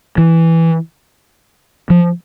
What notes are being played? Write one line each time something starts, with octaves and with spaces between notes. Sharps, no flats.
E3
F3